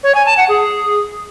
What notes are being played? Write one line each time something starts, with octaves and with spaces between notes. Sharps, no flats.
C#5
G#5
A5
F#5
G#4